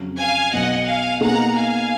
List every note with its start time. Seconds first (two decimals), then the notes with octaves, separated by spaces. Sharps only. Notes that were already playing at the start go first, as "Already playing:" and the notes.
Already playing: F2 C#3 F#3
0.18 F5 G#5
0.52 B1 B2 F#3 D#5 F#5
0.86 F5 G#5
1.20 B2 A#3 D#4 G#4 F#5 A#5
1.55 F5 G#5